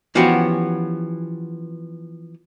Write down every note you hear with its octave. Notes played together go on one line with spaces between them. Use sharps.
E3 F3 B3 C#4 F#4 G4